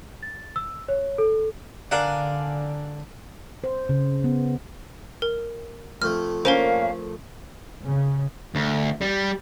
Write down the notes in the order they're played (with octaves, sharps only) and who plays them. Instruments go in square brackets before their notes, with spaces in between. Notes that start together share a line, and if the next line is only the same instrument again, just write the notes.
[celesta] A6
E6
C#5
A4
[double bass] D3 [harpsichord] D4 F#5 [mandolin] A#4 F5 G#5
[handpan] C5
C#3
B3
[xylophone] A#4
[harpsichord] F2 A3 [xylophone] F6
[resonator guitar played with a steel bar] A#3 C#4 [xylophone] A#4 C5 [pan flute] F5
[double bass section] C#3
[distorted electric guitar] D2
G3